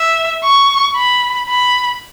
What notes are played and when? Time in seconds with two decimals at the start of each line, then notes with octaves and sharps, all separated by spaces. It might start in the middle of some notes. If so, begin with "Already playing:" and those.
Already playing: E5
0.43 C#6
0.96 B5
1.49 B5